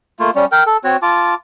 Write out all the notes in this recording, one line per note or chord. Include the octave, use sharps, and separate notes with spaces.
A3 A#3 F4
G3 C#4
A#4 G5
A4
C4 F#4 C#5
F4 A5 D6